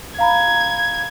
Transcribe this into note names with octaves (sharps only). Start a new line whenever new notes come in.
F5 A#5 B5 G#6